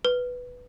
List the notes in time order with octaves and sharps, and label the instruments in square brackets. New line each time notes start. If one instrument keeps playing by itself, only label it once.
[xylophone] B4